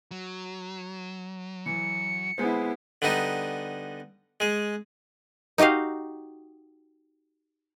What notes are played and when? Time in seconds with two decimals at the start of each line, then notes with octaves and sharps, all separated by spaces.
0.11 F#3
1.66 E3 C#7
2.38 G#3 B3 E4 C5
3.02 D3 G3 B3 D#4
4.40 G#3 G#4
5.58 D#4 F#4 G4 D#5 F5